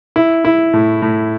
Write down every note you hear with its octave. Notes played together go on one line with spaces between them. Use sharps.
E4
E4
A2
A2